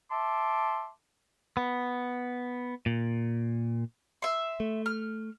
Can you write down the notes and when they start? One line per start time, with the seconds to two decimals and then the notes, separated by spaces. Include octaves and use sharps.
0.11 E5 A5 C6 D6
1.57 B3
2.86 A#2
4.22 E5 C6
4.60 A3
4.86 F6